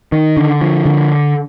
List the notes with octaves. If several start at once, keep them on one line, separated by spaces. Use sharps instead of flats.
D#3
D3
F3
D3